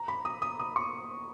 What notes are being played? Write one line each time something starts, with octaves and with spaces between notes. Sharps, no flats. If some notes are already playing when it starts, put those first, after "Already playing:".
Already playing: A#5
B5
D#6
D#6
D#6
C#6